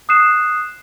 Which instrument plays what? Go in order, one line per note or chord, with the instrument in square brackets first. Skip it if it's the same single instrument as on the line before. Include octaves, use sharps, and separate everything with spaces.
[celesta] D#6 F#6 C7 E7